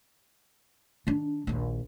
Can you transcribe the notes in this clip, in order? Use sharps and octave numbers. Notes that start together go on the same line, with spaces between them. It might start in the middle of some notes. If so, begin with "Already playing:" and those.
D#3 D4
A#1 D#2